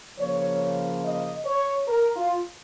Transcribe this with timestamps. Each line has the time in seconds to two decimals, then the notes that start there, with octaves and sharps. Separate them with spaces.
0.18 C#3 F3 A#3 C#5
1.03 D#5
1.45 C#5
1.88 A#4
2.17 F4